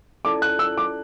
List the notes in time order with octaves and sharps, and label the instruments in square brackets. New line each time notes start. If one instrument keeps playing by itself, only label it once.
[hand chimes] C#4 E4 A4 D5 A5 [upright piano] D6
[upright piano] F#6
E6
D6